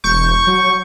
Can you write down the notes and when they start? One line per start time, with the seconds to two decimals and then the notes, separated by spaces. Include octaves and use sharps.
0.04 E1 C#6 G6
0.47 F#3